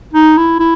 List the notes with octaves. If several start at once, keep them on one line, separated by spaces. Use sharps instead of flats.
D#4
E4
E4